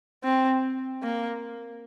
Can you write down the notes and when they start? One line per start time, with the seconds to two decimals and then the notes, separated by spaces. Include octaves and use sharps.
0.24 C4
1.03 A#3